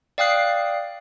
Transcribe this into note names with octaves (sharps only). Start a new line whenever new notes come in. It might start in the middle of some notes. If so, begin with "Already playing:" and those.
D5 F5 G5 D#6 F#6 C7